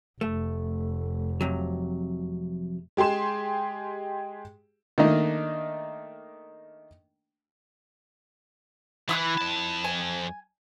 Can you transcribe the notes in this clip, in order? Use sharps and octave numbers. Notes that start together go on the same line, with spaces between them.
F1 A3
F2 C3 F#3
G#3 G4 G#4 C6 E7
D#3 A3 A#3 D4 D#4 D#5
E3 E4 D#6 F#6
F2 A5
G#5